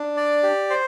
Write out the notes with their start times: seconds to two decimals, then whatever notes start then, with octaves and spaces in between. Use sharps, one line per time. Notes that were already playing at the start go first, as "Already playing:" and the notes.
Already playing: D4
0.17 D5
0.43 G4
0.70 C5